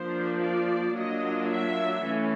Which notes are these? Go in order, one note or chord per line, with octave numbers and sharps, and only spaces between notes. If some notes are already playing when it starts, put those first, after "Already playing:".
Already playing: F3 A#3 D4 F4 C5
D5
F#3 A#3 D4 F4 D#5
E5
E3 A3 C#4